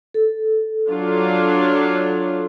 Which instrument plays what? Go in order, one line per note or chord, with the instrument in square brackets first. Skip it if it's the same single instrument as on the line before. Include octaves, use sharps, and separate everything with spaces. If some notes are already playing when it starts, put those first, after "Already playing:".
[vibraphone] A4
[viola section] F#3 D4 F4